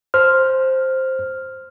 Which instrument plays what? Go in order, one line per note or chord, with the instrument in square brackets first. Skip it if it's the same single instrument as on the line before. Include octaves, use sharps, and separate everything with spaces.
[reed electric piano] C5 F6